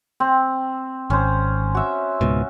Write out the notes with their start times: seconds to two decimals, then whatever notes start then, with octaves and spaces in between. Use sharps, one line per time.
0.20 C4
1.10 G#1 C#4 C5
1.75 F#4 E5
2.21 C#2 G#2 B2